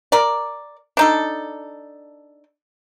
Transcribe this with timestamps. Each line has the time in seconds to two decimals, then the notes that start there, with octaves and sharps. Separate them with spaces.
0.12 A#4 D5
0.97 D4 D#4 A4